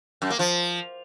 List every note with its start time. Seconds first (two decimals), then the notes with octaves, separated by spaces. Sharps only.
0.22 F#2
0.30 A#3
0.39 F3